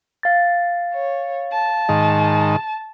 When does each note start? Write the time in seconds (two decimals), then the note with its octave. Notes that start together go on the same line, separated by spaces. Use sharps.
0.23 F5 A6
0.94 C#5
1.52 A5
1.89 G#2 D#3